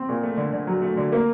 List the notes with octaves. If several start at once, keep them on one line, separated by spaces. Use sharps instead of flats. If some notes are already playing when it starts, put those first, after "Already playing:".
Already playing: C4
A#2
A3
D3
D3
F#3
A3
D3
A#3